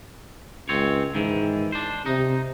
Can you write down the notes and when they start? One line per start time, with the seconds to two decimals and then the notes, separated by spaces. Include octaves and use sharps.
0.69 C#2 C4 C#5
1.15 G#2 D#3 E3
1.72 D4 C5
2.06 C3 D#4